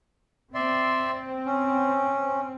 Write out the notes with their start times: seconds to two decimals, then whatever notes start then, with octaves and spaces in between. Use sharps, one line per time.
0.54 C4 D5 E5 C6
1.46 C#4